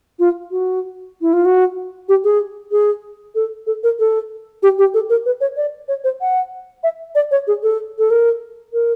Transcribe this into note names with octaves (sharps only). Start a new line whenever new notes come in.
F4
F#4
E4
F4
F#4
G4
G#4
G#4
A4
A4
A#4
A4
G4
G4
A4
A#4
B4
C#5
D5
C#5
C5
F#5
E5
D5
C#5
G#4
A4
A4
A#4
A#4